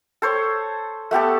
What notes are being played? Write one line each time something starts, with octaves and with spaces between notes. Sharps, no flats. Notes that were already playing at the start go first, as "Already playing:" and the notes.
A4 C5 C#5
A3 B3 G4 A4